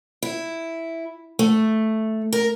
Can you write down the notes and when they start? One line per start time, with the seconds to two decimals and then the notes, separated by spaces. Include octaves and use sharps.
0.22 E4
1.39 A3
2.33 A#4